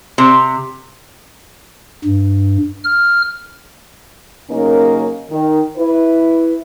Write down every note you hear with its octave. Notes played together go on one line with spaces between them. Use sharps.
C3
G2
F6
C#3 F#3 A#3 C#4 D#4 A#4
D#3
E4 B4